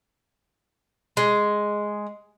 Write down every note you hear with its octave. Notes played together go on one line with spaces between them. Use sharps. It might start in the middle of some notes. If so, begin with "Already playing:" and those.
G#3